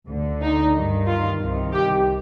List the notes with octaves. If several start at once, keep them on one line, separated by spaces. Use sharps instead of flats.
D2 D3
D#4
G2 D#3
F4
C2 C3 D#3
G4